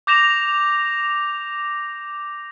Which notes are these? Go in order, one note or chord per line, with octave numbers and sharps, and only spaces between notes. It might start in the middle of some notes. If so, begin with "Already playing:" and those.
D6 G6 A#6 E7 F7